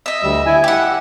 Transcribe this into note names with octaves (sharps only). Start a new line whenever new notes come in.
D#5 E5
D2 G3 E6
E4 G#5
G4 E5 F#5